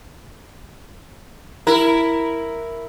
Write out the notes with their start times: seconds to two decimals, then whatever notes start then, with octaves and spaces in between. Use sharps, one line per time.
1.67 E4 A#4